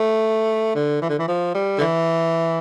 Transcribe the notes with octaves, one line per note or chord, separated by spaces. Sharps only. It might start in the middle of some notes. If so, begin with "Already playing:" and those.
Already playing: A3
D3
E3
D3
E3
F3
G3
D3
E3